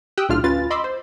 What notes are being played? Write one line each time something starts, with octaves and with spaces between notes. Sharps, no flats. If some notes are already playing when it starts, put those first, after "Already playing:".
G4 G5 D#6 E6 F#6
B1 A2 D4 F4 F6
D2 C#4 F4 B4 A6
D#5 B5 C6 D6 E6
C5